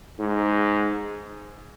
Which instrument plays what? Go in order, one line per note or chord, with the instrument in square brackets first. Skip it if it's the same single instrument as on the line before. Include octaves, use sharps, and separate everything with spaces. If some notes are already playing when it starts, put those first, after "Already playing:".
[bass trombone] G#2